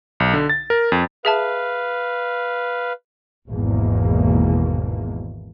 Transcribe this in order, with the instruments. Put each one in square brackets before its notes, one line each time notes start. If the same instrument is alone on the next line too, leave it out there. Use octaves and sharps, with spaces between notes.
[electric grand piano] B1
D3
A6
A#4
F2
[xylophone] G#4 E5 A5 [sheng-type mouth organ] B4 F5
[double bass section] G#1 E2 G#2 B2 A#3